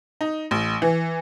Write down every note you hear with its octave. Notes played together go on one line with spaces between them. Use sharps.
D#4
A1
E3